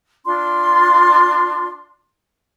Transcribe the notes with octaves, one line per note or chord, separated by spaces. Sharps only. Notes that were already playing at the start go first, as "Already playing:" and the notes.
D4 F4 C6